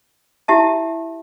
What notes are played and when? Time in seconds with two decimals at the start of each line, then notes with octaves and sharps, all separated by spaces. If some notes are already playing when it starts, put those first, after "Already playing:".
0.48 E4 G4 E5 A5